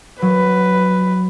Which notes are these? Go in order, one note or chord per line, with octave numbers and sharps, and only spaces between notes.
F#3 B4